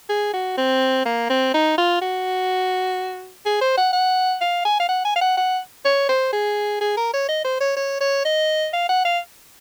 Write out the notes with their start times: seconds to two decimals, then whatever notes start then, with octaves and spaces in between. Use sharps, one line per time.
0.09 G#4
0.34 F#4
0.58 C4
1.06 A#3
1.30 C4
1.54 D#4
1.78 F4
2.01 F#4
3.45 G#4
3.61 C5
3.77 F#5
3.93 F#5
4.41 F5
4.65 G#5
4.80 F5
4.89 F#5
5.05 G#5
5.16 F5
5.21 F#5
5.37 F#5
5.85 C#5
6.09 C5
6.33 G#4
6.81 G#4
6.97 A#4
7.13 C#5
7.29 D#5
7.45 C5
7.61 C#5
7.76 C#5
8.01 C#5
8.25 D#5
8.73 F5
8.89 F#5
9.05 F5